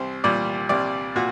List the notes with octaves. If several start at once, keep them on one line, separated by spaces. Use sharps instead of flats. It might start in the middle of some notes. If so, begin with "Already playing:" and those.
Already playing: C2 C5
A#2 G3 D5
C2 D5
A#2 F#4